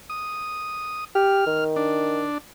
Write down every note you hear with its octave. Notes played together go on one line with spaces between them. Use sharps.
D#6
G4 F6
D#3
D4